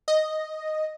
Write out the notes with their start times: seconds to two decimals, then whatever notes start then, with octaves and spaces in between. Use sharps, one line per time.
0.08 D#5